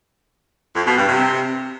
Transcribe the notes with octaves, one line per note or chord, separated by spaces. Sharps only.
F2
B2
G2
C3